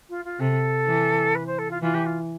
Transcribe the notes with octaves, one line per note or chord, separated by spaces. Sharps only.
F4
F4
C3 A4
E3
B4
C5
A4
F4
E3 F4
G4
F4